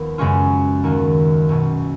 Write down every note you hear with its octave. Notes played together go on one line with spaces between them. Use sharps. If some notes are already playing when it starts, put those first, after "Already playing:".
Already playing: D#2 F3 B3
F#2 C#3 G#3 C#4 F4
D#2 D#3 A#3
C#2 B2 F#3